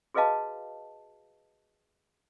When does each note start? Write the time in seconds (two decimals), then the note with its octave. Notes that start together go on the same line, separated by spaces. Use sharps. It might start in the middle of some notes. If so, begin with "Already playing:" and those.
0.14 F#4 G#4 B4 D#5 F5 A5